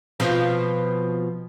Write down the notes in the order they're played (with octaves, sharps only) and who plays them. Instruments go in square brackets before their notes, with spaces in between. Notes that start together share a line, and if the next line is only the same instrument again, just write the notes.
[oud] B2 F3 C4